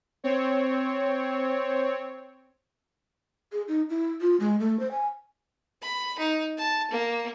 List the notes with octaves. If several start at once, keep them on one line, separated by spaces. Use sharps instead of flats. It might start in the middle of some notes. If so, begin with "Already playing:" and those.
C4 C#5
G#4
D#4
E4
F4
G#3
A3
C5
G#5
B5
D#4
A5
A#3